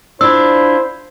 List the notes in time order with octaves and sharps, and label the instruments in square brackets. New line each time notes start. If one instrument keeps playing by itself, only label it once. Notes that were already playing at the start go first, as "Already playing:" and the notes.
[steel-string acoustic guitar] D4 F4 [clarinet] E4 [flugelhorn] C5 [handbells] E6